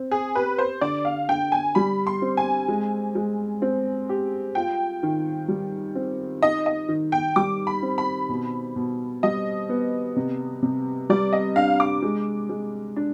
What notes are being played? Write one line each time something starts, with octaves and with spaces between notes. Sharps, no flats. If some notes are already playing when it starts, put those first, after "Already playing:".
Already playing: C4
G#4
G4 B4
C5
D3 D5
F5
D3 G5
G#5
G3 B5
C6
C4
G#5
G#3
G#3
C4
G4
F4 G5
D#3
G3
C4
D#4 D#5
D#5
D#3
G5
G3 D6
B5
C4
B5
B2
B2
G3 D#5
B3
C3
C3
G3 D5
D#5
D4 F5
D6
G#3
G#3
D4